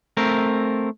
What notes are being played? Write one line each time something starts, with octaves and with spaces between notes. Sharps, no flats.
A3 C4 A#4